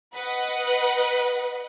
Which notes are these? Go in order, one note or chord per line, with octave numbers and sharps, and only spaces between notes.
B4 D#5 F#5